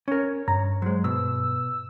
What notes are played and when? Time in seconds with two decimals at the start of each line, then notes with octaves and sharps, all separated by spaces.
0.08 C#4 A#4 C#5
0.48 G2 A#5
0.82 F#3 G#3 C5
1.04 B2 E6